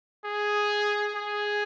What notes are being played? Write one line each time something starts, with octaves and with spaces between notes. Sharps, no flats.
G#4
G#4